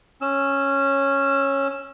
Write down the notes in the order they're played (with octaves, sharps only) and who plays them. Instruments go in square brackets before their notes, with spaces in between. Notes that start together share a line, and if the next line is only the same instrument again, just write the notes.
[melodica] C#4 E6